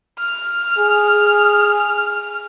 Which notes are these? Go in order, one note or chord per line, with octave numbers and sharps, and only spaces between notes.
F6
G#4